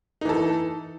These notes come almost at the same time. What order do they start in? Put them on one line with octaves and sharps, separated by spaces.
D#4 E3 A4